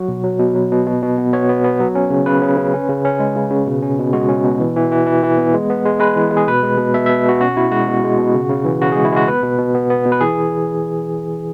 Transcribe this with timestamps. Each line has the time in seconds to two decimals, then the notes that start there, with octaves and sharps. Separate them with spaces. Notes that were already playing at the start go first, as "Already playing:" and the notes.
Already playing: F#3 F#4
0.08 B2
0.24 F#3
0.40 B2
0.55 F#3
0.71 B2
0.87 B2
1.02 B2
1.18 B3
1.33 B3 C#5
1.49 B3
1.64 B3
1.80 F#3
1.95 C#4
2.10 C#3
2.26 C#3 B4
2.42 C#3
2.57 C#3
2.74 C#4
2.89 C#3
3.05 C#4
3.20 G#3
3.36 C#3
3.51 C#3
3.67 B2
3.83 C#4
3.99 B2
4.13 G#3 F#4
4.29 C#4
4.45 B2
4.60 E3
4.76 E3
4.91 E3
5.07 E3
5.23 E3
5.38 B3
5.54 G#3
5.70 B3
5.86 G#3
6.00 G#3 B4
6.16 E3
6.31 G#3
6.37 G#4
6.47 B2 B4
6.63 G#3
6.78 B2
6.94 B2 E5
7.06 B2 E5
7.25 B2 F#4
7.41 C#4 F#4
7.56 B2 E4
7.72 G#3 F#4
7.88 B2
8.04 G#3
8.18 B2
8.34 C#3
8.50 C#3
8.65 E3
8.81 C#3 F#4
8.92 G#3 G#4
9.05 E4
9.12 G#3 F#4
9.28 B3 B4
9.43 B2
9.58 B2
9.75 B3
9.90 B3
10.05 B2
10.12 B4
10.21 E3 G#4